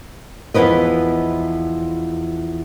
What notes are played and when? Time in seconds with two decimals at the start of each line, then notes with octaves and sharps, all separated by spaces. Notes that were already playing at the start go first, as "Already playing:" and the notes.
0.54 E2 F3 E4 B4 D#5